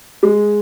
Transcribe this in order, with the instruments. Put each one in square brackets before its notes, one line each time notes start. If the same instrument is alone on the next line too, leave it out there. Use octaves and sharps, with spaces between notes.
[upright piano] G#3